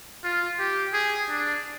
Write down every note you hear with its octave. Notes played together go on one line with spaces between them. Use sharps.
F4
G4
G#4
D4